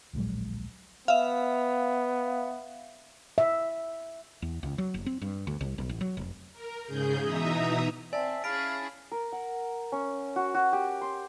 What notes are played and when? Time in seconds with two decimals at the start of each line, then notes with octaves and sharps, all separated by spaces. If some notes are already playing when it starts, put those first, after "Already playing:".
0.13 D1 A#1 F#3 G#3
1.08 B3 E5 F5
3.38 E5
4.42 E2
4.63 C#2
4.78 F#3
4.94 F#1
5.06 C4
5.22 G2
5.47 D2
5.61 C2
5.78 B1
5.89 A1
6.01 F#3
6.17 F1
6.52 A#4
6.85 G#2 C#3 G#4 G6
7.22 B2 E3 D#4 E5 A#5 D#6
8.13 C4 D5 E5 G#5 A5
8.44 C#4 E4 G#4 F5 B5 A6 B6 D7
9.12 A#4
9.32 F#5
9.92 C#4
10.36 F#4
10.54 F#4
10.73 G4
11.01 C6